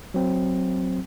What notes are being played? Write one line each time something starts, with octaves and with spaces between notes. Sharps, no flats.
F#3 C4